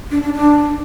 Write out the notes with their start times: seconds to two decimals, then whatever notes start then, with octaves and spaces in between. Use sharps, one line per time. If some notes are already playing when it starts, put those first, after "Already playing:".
0.11 D4
0.22 D4
0.33 D4